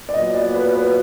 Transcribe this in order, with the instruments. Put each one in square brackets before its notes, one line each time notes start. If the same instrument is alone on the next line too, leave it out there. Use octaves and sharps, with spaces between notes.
[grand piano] D5
[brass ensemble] A#2 F#3 B3 [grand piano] D#5
[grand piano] D5
B4
B4